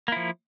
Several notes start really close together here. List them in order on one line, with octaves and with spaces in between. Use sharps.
A#3 E4 F3